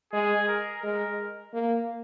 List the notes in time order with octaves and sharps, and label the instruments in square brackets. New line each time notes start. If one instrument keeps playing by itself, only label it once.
[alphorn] G#3 [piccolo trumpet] G#4
[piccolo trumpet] A#4
[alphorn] G#3 [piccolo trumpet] A#4
[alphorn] A#3